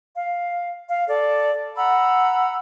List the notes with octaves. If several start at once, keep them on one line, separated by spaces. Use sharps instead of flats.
F5
F5
A4 D5
F#5 A#5 B5 E6